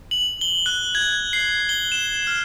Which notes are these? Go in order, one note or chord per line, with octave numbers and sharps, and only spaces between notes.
F#7
G7
F#6
G#6
C7
G7
E7
F6